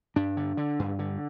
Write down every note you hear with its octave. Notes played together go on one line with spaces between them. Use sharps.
G2 D4
D3
D3
G2
D3